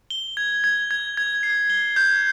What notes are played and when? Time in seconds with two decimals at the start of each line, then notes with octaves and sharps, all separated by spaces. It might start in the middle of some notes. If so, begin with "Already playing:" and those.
0.10 G7
0.37 G#6
0.64 G#6
0.91 G#6
1.17 G#6
1.43 C7
1.70 G7
1.96 G6